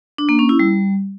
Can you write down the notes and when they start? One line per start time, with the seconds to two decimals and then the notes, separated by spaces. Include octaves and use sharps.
0.18 D4
0.29 A#3
0.39 C#4
0.49 E4
0.59 G3